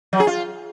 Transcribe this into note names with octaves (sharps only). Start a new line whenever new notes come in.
F#3
G#4
F4